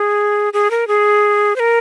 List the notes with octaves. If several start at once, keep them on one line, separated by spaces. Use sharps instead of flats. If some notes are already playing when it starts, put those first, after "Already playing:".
Already playing: G#4
G#4
A#4
G#4
C5
A#4